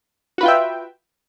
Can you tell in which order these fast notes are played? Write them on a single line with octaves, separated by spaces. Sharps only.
F#4 B4 F4 G5 E5